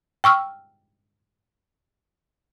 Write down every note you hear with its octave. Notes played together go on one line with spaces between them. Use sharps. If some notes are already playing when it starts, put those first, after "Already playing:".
G5 C#6 E6 F6